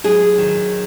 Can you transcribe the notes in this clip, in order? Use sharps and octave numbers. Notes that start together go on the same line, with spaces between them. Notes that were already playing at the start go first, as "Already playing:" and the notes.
F#3 G#4
D#3